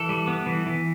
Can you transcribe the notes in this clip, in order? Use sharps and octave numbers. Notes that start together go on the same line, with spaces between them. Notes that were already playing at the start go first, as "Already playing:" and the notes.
Already playing: E3 A4
G3
B3
E3
E3